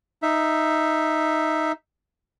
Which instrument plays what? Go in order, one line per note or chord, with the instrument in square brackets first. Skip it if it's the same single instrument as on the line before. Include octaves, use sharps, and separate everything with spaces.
[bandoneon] D#4 E5